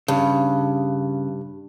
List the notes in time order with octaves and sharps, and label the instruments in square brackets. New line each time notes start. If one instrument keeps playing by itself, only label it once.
[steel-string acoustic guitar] G2 [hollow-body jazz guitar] C#3